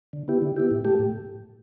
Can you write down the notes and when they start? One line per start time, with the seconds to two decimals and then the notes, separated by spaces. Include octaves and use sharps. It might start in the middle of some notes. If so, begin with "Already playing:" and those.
0.13 D3
0.28 B3 E4 G4
0.42 D3
0.56 B3 E4 G4
0.71 A2
0.85 A3 G4
0.99 A2